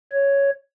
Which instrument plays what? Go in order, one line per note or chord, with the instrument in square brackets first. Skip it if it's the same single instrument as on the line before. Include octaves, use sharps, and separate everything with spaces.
[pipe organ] C#5